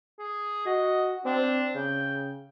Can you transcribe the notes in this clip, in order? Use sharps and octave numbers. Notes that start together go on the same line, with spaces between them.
G#4
F#4 D#5
C4 D4
C#3 G5